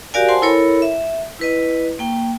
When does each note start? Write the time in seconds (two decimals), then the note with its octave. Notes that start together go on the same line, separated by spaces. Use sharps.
0.14 F#4 G4 A#4 D5 F5 G#5
0.29 C5 F#5 G#5 A5 C6
0.42 E4 A4 A#4 C#5 B5
0.82 E5
1.39 E4 B4 D#5
1.99 A#3 G5